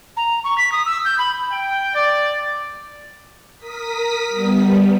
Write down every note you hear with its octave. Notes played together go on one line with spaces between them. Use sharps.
A#5
C#6
B6
D#6
E6
G6
B5
G5
D5
A#4 D#6 B6
G3 B3